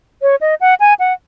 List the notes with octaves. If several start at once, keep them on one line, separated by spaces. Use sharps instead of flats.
C#5
D#5
F#5
G#5
F#5